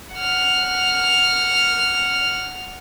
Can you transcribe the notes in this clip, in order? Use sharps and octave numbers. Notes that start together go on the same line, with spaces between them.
F#5 F6